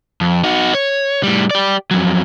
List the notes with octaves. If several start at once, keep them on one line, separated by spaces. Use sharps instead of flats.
F2
D#4 F#4
C#5
A2 G3
G4 D5
F2 F#3